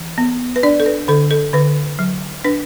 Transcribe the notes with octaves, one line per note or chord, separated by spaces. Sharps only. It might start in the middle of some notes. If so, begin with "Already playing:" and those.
Already playing: E3
B3
B4
D4 D5
A4
B4
D3 A4
A4
D3 B4
F#3
D4 B4